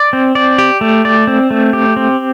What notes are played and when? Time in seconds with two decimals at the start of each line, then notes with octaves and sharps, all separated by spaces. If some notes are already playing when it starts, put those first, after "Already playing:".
Already playing: D5
0.13 C4
0.35 D5
0.58 G4
0.81 A3
1.05 D5
1.27 C4
1.51 A3
1.73 G4
1.96 C4